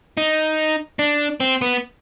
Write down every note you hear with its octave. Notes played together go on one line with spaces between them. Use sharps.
D#4
D4
C4
B3